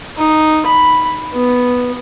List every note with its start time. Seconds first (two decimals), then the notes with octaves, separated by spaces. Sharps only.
0.17 D#4
0.66 B5
1.33 B3